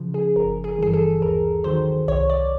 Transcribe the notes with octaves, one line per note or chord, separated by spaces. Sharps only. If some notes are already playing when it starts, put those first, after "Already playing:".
Already playing: C#3 F3
G#4
G1 A#4
G#4
G2 E3 G#4
A4
D#2 A#4
D#3 F#3 C5
C2 C#5
D5